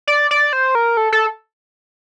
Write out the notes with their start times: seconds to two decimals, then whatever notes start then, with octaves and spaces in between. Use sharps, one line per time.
0.07 D5
0.31 D5
0.53 C5
0.75 A#4
0.97 A4
1.12 A4